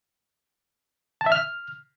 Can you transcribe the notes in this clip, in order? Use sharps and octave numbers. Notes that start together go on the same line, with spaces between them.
A5
E5
F6